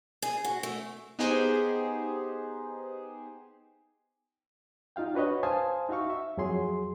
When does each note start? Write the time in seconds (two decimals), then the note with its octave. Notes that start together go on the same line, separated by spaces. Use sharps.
0.22 G#4
0.44 F#4
0.63 A3
1.19 B3 D#4 G4 G#4 C5
4.96 D#4 F4 F5 G5
5.14 D4 F#4 B4 C#5 D#5
5.43 C5 F5 G#5 A5 D#6
5.89 D#4 F#4 E5 F5 C#6
6.10 E5
6.37 F2 F#3 G#4 C6